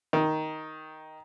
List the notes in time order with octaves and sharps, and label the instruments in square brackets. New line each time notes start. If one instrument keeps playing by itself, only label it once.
[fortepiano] D#3